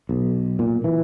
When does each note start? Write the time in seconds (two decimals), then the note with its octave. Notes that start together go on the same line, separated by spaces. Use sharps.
0.09 B1
0.59 A#2
0.84 E3